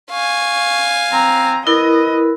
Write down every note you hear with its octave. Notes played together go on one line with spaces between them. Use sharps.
F5 G#5 C#6
C4 A#5
E4 A#4 B4 D#5